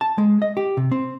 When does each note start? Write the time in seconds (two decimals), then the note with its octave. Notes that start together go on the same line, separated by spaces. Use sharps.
0.01 A5
0.18 G#3
0.42 D#5
0.57 G4
0.77 C3
0.92 C4